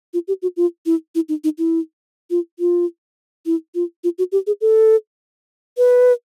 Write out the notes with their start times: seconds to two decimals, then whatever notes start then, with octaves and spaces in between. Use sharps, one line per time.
0.14 F4
0.28 G4
0.42 F#4
0.57 F4
0.86 E4
1.15 E4
1.29 D#4
1.44 D#4
1.58 E4
2.30 F4
2.59 F4
3.46 E4
3.75 F4
4.04 F4
4.18 F#4
4.32 G4
4.47 G#4
4.61 A4
5.78 B4